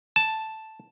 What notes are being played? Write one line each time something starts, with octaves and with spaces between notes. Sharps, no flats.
A5